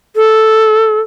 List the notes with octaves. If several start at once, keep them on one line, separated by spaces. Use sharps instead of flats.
A4